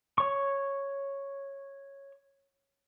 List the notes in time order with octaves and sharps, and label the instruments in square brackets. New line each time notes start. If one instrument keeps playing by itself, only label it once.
[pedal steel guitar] C#5 C#6